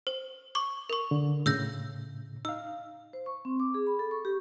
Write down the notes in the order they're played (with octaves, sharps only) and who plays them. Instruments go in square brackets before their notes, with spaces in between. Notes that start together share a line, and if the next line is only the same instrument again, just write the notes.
[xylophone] C5
C#6 D6
A#4 C#6
[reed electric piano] D3
[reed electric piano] A2 C#3 [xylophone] E6 G6 A#6
[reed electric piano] D#4 F5 [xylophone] E6
[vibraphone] C5
C#6
C4
D6
G#4
B5
A4
C#6
G4